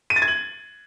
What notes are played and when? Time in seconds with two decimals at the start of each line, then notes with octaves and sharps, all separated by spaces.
0.10 D#7
0.16 A6
0.22 G#6
0.28 F#7